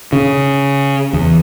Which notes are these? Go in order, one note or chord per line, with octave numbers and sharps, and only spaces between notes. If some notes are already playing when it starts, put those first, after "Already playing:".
C#3
E2